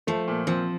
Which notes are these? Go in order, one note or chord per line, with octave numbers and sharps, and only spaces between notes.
F3 A3
A#2
F3 C4